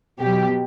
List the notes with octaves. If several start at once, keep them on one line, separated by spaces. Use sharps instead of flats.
B2 F#3 G4